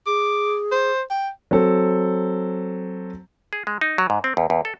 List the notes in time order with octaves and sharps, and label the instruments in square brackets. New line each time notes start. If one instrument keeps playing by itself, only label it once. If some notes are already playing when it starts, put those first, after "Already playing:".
[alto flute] G#4 [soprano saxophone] D6
[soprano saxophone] C5
G5
[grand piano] F#3 C4 A4
[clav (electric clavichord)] G#4
G#3
D#4
F#3
G#2
C4
E2
E2
A4